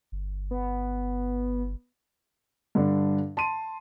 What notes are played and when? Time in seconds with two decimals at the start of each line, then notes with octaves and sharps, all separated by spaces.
0.12 G1
0.51 B3
2.75 G2 D3 D4
3.37 A5 C6 D#7